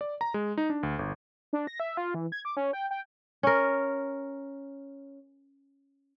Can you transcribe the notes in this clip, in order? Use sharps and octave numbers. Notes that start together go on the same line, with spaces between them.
D5
A#5
G#3
D#4
D4
D2
G1
D4
A#6
E5
F4
E3
G#6
D6
C#4
G5
G5
C#4 A#4